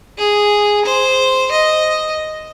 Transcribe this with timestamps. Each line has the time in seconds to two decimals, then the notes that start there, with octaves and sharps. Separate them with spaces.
0.18 G#4
0.85 C5
1.51 D#5